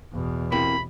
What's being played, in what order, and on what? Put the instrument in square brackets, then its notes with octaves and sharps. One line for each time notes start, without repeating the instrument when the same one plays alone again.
[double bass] E2 B2
[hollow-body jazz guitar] C3 A#3 E4 [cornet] B5